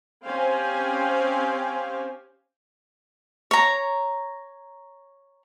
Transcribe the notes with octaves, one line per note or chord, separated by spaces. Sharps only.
C4 C#4 G4 C5 F5 G#5
C#5 A#5